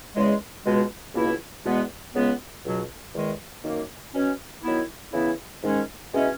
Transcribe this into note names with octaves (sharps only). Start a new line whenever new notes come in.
E2 C#3 G#3
C#2 B2 G#3
C#2 B2 A#3 E4
E2 B2 G#3 B3
C#2 C#3 G#3 B3
C#2 B2 F#3
E2 D#3 G#3
F#2 D#3 A#3
B2 F#3 C#4
D#3 F#3 B3 E4
C#3 E3 B3 E4
G#2 D#3 G#3 C#4
B2 G#3 C#4 E4